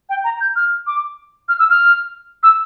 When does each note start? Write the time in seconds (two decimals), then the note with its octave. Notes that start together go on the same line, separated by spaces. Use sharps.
0.09 G5
0.24 A#5
0.41 G6
0.56 F6
0.87 D6
1.49 F6
1.59 E6
1.70 F6
2.43 E6